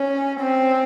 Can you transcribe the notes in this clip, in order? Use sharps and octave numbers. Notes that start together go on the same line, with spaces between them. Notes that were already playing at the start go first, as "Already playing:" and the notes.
Already playing: C#4
C4